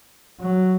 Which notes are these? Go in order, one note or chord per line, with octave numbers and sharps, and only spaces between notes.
F#3